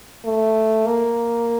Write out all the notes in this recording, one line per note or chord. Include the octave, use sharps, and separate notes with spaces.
A3
A#3